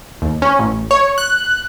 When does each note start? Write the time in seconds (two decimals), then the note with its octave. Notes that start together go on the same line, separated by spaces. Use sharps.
0.22 D#2
0.42 C#4
0.59 A1
0.91 C#5
1.18 F#6